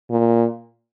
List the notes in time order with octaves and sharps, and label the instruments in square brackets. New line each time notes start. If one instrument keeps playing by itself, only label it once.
[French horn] A#2